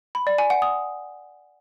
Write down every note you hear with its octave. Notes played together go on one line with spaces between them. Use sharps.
B5
D5
G#5
F#5
D#6